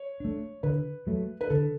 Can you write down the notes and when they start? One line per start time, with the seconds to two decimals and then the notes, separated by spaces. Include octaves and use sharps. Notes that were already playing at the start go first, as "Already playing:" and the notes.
Already playing: C#5
0.20 A3 D4
0.63 D3 B4
1.07 F#3 A3
1.41 B4
1.50 D3 A4